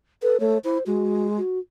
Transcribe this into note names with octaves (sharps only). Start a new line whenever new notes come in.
A4 B4
A3 C#5
E4 C5
G#3 F#4
F#4